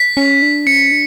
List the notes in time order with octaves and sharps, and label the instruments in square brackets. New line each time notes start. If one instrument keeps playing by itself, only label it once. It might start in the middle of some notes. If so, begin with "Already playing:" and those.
Already playing: [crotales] B6
[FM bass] C#4
D4
[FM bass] C#4 [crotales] C#7
[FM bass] D4